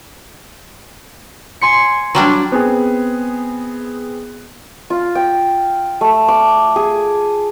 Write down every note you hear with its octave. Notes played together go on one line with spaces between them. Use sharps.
G#5 C6 C#7
F#3 G3 D4
B3 C4 G#4
F4
G5
A3
D6
G#4